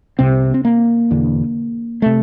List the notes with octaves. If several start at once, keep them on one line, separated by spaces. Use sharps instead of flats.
C2 C3 C4
C4
A#3
E1 E2 D3
C3 A3